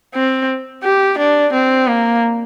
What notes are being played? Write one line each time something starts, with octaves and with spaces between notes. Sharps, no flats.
C4
G4
D4
C4
A#3